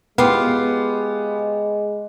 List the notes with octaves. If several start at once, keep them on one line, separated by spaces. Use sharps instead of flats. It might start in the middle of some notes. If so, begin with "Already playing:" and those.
G#3 B3 F4 G4 F5